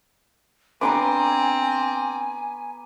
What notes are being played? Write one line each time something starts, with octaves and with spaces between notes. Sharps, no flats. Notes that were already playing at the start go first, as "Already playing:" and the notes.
B3 C4 D4 B4 G#5 A#5 C6 D6